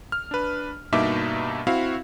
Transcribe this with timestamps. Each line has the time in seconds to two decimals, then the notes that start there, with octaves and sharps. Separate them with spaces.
0.12 F6
0.31 D4 B4
0.93 G2 B2 A#3 D#4 E5 D6
1.67 C4 E4 F#4 E5 F5